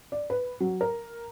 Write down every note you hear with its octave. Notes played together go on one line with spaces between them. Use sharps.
D5
B4
F#3
A#4